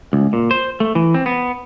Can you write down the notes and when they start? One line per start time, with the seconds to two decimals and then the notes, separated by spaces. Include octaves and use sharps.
0.13 C#2
0.33 A#2
0.51 C5
0.80 A3
0.95 E3
1.14 C4
1.26 B3